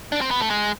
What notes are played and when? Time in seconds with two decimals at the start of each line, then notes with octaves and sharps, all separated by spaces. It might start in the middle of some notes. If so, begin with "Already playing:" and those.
0.12 D4
0.21 C4
0.31 B3
0.40 A3
0.50 G#3